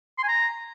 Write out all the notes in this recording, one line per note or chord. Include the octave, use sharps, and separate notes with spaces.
C6
G#5
A#5